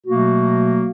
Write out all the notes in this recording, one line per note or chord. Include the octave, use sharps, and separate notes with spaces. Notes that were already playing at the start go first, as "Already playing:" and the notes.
B2 F#3 A3 A#3 F#4